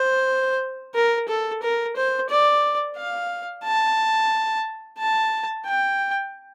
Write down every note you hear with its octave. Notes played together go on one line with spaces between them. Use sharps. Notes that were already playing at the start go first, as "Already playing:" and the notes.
Already playing: C5
A#4
A4
A#4
C5
D5
F5
A5
A5
G5